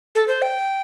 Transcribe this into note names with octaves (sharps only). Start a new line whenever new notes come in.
A4
C5
G5